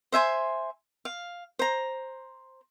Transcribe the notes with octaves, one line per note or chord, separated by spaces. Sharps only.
C5 E5 G#5 C6
F5
C5 A#5